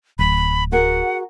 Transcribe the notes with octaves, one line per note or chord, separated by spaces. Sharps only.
D1 B5
F#4 G#4 A#4 F#5